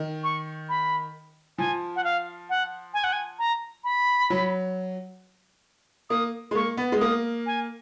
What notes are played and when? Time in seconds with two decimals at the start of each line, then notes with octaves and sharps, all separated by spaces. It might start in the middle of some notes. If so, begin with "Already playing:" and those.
Already playing: D#3
0.23 C#6
0.69 B5
1.58 F3 G#5
1.96 F#5
2.04 F5
2.50 F#5
2.94 G#5
3.04 F#5
3.12 G#5
3.39 A#5
3.84 B5
4.30 F#3
6.10 A#3 D#6
6.51 G#3
6.55 A#3 C#6
6.77 B3
6.92 G#3
7.00 A#3 D#6
7.46 G#5